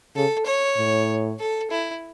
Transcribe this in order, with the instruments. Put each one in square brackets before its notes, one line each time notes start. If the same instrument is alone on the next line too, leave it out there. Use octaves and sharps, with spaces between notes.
[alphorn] C#3 [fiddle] A4
[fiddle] C#5
[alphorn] A2
[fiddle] A4
E4